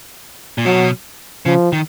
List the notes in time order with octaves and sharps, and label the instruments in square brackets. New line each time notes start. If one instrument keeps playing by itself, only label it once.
[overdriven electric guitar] A#2
[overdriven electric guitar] B2 [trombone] F#3
[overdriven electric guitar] C#3 [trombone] F3
[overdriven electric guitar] D#3